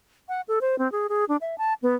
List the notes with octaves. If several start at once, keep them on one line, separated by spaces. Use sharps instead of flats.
F#5
A4
C5
C4
G#4
G#4
D4
E5
A5
B3